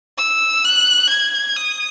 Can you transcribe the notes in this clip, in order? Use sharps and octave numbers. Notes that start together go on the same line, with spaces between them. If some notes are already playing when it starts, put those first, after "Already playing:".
E6
F#6
G#6
D#6